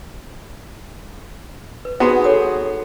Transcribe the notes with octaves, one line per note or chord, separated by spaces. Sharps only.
B4
B3 D#4 F#4 G#4 A#5 C6
A4 C#5 D#6